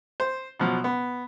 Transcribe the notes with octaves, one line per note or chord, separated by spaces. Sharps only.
C5
B2 F3 F#3
B3